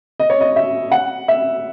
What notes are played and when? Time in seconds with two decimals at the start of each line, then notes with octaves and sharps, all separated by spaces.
0.20 D#5
0.30 C#5
0.41 D#5
0.56 E5
0.92 F#5
1.28 E5